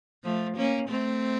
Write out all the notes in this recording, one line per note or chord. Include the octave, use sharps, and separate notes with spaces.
F3 A3
A#3 C#4
A3 C4